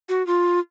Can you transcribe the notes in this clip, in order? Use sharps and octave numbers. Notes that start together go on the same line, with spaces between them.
F#4
F4